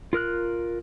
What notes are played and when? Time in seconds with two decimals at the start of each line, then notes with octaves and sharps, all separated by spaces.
0.13 F4 A#4 F6 F#6